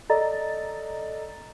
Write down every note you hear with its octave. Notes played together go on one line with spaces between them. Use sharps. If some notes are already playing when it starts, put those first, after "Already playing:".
A4 D5 D#5 A#5 A6